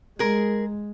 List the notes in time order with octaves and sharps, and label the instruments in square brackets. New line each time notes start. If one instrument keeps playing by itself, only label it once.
[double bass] G#3 [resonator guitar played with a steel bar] G#4 A#4